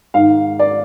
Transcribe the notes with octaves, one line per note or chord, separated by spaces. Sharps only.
G#2 D#3 F5
D5